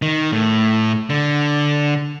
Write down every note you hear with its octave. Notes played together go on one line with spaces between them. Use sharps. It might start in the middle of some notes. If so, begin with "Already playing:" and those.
D#3
A2
D3